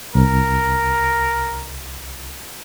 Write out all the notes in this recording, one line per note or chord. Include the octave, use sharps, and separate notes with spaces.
C2 A#4